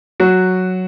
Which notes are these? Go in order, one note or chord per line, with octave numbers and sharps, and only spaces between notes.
F#3 F#4